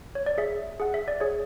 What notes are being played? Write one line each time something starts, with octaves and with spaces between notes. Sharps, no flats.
C#5
D5
G#4 E5
G#4 F#5
E5
D5
G#4 C#5